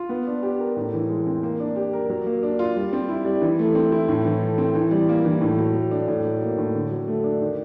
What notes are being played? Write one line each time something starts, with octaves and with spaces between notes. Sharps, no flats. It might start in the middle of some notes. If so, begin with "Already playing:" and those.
Already playing: F4
B3
D4
G4
A#4
A2
E3
G#3
C4
A#3
D4
G4
A#4
F#3
A#3
D4
F4
G3
C4
E4
G3
E3
A3
C4
E4
A2
E3
A3
C4
E3
G3
A#3
E3
A2
F#3
A3
D4
A2
F#3
A#3
A2
D3
F#3
A3
D4
D#3